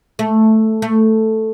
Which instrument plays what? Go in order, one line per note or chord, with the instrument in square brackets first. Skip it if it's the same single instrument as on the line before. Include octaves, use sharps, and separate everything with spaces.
[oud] A3
A3